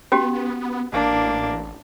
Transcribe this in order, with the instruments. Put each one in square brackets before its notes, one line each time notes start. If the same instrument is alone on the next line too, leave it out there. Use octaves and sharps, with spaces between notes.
[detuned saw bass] B3 [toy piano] C#4 F#4 G4
[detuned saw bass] A1 [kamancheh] A#3 D4